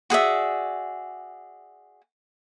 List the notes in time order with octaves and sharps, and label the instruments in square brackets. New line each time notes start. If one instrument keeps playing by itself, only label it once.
[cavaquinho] F#4 G#4 D5 E5